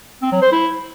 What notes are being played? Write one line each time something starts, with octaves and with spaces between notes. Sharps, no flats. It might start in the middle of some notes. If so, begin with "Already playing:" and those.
C4
F#3
C5
E4